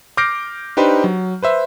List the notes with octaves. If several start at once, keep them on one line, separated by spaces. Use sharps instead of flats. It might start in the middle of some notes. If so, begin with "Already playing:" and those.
D6 F6 G6 A#6 C7 D7
D4 D#4 G4 B4 C5
F#3
B4 C5 E5